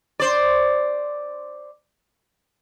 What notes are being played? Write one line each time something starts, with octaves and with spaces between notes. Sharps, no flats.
C5 D5